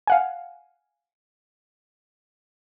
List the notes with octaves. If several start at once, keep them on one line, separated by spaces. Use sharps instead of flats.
F5 F#5 G#5